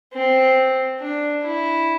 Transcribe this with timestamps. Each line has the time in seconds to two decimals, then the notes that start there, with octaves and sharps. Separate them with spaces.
0.14 C4
1.01 D4
1.45 E4